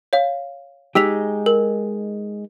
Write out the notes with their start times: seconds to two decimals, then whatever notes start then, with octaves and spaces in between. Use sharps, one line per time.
0.13 C#5 F5
0.95 G#3 D#4 G4 E6 B6 F7
1.46 A#4